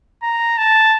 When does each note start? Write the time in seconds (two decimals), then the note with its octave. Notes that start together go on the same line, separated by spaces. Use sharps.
0.23 A#5
0.58 A5